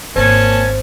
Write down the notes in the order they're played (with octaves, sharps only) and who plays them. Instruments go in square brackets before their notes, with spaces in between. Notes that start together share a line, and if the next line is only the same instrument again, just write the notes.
[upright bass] G#1 [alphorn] A#3 [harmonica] C#4 G#5 A5 [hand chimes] C5